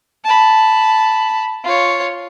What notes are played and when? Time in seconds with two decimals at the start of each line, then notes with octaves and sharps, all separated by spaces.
0.24 A5 B5
1.64 F4 C#5